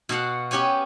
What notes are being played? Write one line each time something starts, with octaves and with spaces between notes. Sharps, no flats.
B2 F#4 F5 F#5
B3 C#4 G4 C#5 G#5